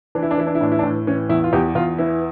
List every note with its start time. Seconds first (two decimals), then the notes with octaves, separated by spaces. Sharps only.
0.15 E3 D4
0.23 E4
0.31 D4
0.38 E3 E4
0.47 D4
0.55 E4
0.61 A2 D4
0.72 E4
0.79 D4
0.83 A2
1.07 E3 C#4
1.29 E2 E4
1.44 F4
1.53 E2 G4
1.75 E2 F4
1.98 E3 E4